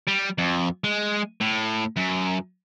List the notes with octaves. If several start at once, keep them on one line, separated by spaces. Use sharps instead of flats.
G3
F2
G#3
A2
F#2